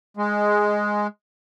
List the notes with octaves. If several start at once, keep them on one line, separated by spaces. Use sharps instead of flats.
G#3